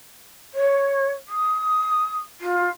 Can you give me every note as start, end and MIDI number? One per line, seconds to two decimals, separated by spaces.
0.54 1.11 73
1.29 2.18 87
2.41 2.69 65